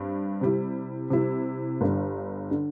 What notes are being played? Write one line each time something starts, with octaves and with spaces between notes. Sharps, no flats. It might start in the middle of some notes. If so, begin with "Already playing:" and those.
Already playing: G2 G3 C4
C3 G3 E4
C3 G3 E4
G1 G2 D3
D3